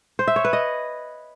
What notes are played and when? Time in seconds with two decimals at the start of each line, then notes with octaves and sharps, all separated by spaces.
0.19 C5
0.28 E5
0.36 C#5
0.45 B4
0.53 D#5